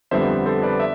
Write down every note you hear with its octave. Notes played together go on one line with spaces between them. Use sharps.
F2 D3 G3 B3 C5 E5
A4 C5
B4 D5
E5